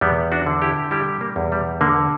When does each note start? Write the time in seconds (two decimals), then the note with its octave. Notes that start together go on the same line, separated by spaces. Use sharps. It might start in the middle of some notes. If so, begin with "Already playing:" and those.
0.01 E2 G3 B3
0.32 D4 F#4
0.46 D3
0.62 E4 G4
0.91 G3 E4 G4
1.21 A#3
1.36 E2
1.52 G3
1.81 D3 A#3